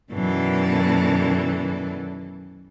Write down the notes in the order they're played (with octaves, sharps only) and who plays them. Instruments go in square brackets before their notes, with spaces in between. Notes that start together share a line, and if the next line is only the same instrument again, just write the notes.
[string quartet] F#2 B2 D#3 E3 A4 D5